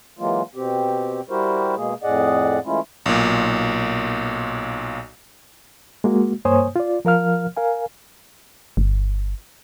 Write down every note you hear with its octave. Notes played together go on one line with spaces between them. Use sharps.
E3 F#3 G#3 A#3 F4
B2 C4 G4
G3 E4 F#4 G4 A#4 C5
B2 G#3 A#3 G#4
F2 A2 G#4 D5 D#5 F#5
E3 G#3 A3 C#4 E4 F4
B1 A#2
G#3 A#3 F#4
G2 A#3 C5 C#5 G#5 D#6
F4 D5
F3 A#4 F5 F6
A#4 F5 G#5
G1